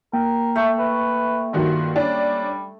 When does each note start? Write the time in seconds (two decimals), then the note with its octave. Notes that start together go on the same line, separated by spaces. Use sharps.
0.13 A#3 A#4 G5
0.56 A3
0.79 B4
1.53 G2 D#3 F4 F#4
1.96 G3 C#4 D4